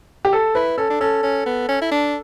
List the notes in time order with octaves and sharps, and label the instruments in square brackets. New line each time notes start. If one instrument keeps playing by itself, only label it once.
[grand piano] G4
A4
[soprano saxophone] E4 [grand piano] B4
[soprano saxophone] C#4 [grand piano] A4
[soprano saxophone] D4
[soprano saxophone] C#4 [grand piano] A4
[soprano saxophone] C#4
B3
C#4
E4
D4